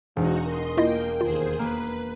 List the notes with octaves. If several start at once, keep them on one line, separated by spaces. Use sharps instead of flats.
E1 G#2 D#4 F#4
A#4 D#5 C6
A#3 E4 F4 D#5 G5 G6 A#6
D#2 F4 G#4 C5
A#3 B4